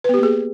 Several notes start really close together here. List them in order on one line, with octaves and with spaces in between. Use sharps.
B4 B3 G4 A#3 G#4